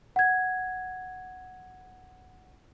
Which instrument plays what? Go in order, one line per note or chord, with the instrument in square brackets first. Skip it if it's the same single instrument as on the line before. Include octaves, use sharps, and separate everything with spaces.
[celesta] F#5 G#6